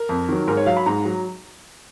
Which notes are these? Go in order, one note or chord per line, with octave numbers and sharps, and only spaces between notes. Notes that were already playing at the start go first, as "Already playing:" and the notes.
Already playing: A#4
F2
D#3 F#3
G#2 A#4
C#5
F#3 F5
B5
G#2 A#5
F#3